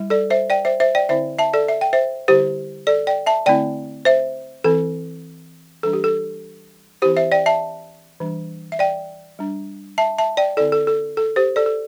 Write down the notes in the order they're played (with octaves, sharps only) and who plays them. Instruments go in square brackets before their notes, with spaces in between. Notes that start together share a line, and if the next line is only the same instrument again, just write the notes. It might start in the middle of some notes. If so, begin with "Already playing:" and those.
Already playing: [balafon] G3 E4
A4 D5
C5 E5
D5 G5
C5 E5
C5 E5
D5 G5
D3 C4 E4 C5 E5
E5 A5
A4 D5
E5
G5
C5 E5
D3 G3 E4 G4 C5
A4 D5
D5 G5
E5 A5
D3 A3 C4 E4 D5 G5
C5 E5
E3 C4 E4 A4
E3 G3 D4 A4
G4
A4
E3 C4 E4 G4 C5
C5 E5
D5 G5
E5 A5
E3 G3 D4
E5
D5 G5
G3 D4
E5 A5
E5 A5
D5 G5
D3 C4 E4 A4 D5
A4
A4
A4
G4 C5
A4 D5
A4